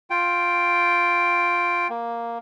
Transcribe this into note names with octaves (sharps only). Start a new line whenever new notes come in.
F4 G5
A#3